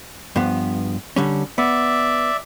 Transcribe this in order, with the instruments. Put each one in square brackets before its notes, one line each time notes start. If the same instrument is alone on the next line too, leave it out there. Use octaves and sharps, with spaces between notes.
[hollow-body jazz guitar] G2 F3 B3
D3 G3 C#4
[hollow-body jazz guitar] B3 [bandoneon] D5 E5